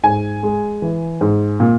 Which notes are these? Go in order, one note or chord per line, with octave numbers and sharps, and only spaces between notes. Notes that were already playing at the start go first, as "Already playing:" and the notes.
G#2 G#5
G#3
E3
G#2
A#2